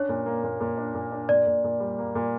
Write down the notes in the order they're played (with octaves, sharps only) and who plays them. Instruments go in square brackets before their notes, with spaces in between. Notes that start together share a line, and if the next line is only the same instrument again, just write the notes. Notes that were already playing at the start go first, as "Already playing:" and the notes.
Already playing: [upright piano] C#4 D4 [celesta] C#5
[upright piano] A#2
A#3
A#2
A#2
D4
A#2
D4
[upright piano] A#2 [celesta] D5
[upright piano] A#2
A#2
G3
A#3
A#2